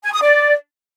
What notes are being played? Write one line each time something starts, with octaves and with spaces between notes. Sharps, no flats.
G#5
D#6
D5